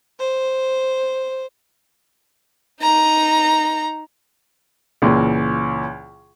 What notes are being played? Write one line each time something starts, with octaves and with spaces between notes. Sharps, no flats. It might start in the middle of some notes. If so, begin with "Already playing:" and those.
C5
D#4 A#5
C#2 A#2 E3